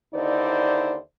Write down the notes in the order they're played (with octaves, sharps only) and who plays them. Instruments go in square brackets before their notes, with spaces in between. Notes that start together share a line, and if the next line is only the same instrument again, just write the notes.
[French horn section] D#2 D3 D#4 E4 C5 D5